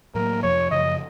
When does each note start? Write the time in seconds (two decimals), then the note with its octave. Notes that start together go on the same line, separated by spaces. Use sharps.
0.15 A2 F#3 A#3 A#4
0.43 F2 C3 F3 C#5
0.71 F#2 C#3 F3 D#5